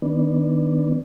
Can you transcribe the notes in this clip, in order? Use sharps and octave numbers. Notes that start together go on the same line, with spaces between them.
D#3 B3 D4